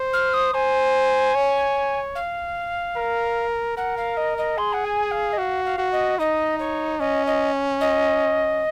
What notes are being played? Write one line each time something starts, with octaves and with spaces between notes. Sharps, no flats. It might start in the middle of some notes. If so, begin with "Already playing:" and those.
Already playing: C5
F6
D#6
C5 G#5
C#5
F5
A#4
A#4 F#5
F5
D#5
D#5
G#4 C6
F#5
G#5
F5
D#5
F#4 F5
F5
F#4
D#5
D#4 D#5
C#5
C#4 D#5
D#5
D#5